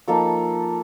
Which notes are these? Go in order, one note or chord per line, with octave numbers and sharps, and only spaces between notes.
F3 A#3 D#4 A4